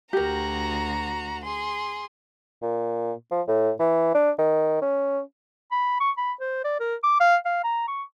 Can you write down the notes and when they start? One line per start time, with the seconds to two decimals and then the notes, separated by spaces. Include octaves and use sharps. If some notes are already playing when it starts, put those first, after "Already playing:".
0.13 D2 F#4 G4 A#4 A#5
1.44 G#4 C6
2.62 A#2
3.31 F3
3.48 A2
3.80 E3
4.15 D4
4.39 D#3
4.82 C#4
5.72 B5
6.00 C#6
6.18 B5
6.40 C5
6.64 D5
6.80 A#4
7.04 D6
7.20 F5
7.45 F5
7.64 A#5
7.88 C#6